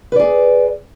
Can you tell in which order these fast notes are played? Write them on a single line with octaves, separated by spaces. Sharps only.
B4 D5 G#4